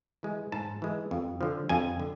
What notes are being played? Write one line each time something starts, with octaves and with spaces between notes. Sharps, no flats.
E3 G#3
G#2 A5
E3 G#3
F2
D3 F3
F2 G#5
D3